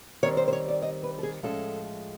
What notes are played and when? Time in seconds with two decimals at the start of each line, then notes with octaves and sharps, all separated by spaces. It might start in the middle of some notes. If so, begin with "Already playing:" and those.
0.23 D#3 G3 C4 C#5
0.37 C5
0.48 C5
0.53 C#5
0.68 D5
0.82 D#5
1.03 B4
1.18 A4
1.23 G#4
1.43 A2 F3 G#3 C#4 A4